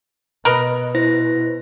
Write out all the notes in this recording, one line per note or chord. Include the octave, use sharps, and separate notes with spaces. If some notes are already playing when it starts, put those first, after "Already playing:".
B2 A#4 B4 D#5
E4 C5 A#6